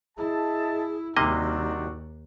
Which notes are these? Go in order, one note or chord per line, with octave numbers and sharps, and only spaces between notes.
E4 G#4 D#5 E5 A5
D#2 C3 G3 A#3 D4 D#4 F#4 D#5